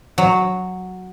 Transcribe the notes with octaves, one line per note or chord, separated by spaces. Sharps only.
F#3